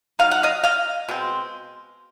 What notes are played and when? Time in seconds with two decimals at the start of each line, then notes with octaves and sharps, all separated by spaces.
0.19 F#3 B3 D#4 F5
0.31 F#5
0.43 D#5 F5
0.64 D#5 F5
1.08 B2 G#3 C4